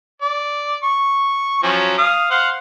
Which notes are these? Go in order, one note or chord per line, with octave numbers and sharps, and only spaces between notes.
D5
C#6
F3 F#3 C#4
F5 D#6
C5 F5 F#5